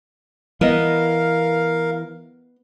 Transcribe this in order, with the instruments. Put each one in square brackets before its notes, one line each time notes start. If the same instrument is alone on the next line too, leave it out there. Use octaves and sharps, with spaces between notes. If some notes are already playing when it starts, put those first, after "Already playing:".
[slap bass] E3 [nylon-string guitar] B3 D#5 [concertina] A#4 F5